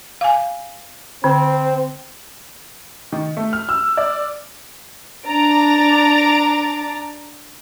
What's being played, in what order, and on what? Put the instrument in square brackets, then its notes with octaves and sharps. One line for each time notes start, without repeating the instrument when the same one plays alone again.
[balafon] F5 G#5
[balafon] D3 [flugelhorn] C4
[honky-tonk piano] D#3
A3
F6
E6
D5
[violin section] D4 A#5 A6 D7